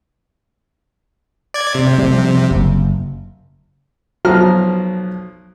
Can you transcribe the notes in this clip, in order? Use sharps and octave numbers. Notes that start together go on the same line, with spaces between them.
D5 G#6
C3
F3 G3
F#1
B1 B2 F3 A#5 F6